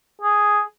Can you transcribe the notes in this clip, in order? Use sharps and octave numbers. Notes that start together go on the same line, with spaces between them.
G#4